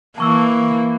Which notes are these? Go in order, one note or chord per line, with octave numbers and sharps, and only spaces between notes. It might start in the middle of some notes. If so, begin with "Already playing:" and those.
E3 A#3 A5 C#6 E6